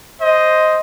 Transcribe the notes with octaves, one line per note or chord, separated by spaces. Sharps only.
C5 D#5